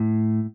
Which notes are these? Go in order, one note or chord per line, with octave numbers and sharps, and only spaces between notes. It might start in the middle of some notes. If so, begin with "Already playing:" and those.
Already playing: A2